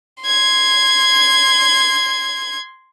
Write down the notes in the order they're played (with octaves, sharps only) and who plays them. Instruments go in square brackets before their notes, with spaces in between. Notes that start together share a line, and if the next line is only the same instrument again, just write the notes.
[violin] C6 G#6